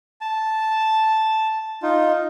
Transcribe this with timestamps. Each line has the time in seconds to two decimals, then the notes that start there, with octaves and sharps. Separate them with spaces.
0.21 A5
1.83 D#4 F4